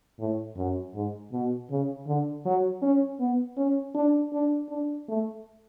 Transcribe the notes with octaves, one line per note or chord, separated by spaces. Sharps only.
A2
F#2
G#2
B2
C#3
D3
F#3
C#4
B3
C#4
D4
D4
D4
A3